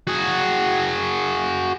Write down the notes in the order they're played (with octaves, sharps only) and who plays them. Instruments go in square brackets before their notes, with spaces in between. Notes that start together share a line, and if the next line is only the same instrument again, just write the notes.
[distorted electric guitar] F#4 G#4